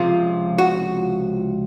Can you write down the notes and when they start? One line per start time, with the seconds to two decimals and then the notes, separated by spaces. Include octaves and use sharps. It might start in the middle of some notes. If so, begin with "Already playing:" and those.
Already playing: C#2 C3 F3 C4 F4
0.58 F#4